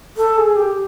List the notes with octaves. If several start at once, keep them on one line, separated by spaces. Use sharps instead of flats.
A4
G#4
G4